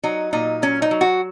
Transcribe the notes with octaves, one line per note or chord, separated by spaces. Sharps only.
F#3 D#4
A#2 D#4
F#3 C#4
D#4
F#3
F#4